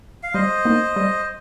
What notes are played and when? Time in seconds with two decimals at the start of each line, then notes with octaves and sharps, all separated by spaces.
0.23 F5
0.34 G3 C5 D#5
0.65 A#3 D#4
0.96 G3